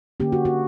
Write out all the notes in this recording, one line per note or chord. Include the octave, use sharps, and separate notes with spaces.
D3 A#3 C#4 G4
F#4
F#4